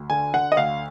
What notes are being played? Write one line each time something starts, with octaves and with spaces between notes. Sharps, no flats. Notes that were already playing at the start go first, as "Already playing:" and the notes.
Already playing: D2
D3 G#5
D3 F#5
D#5
D2 F5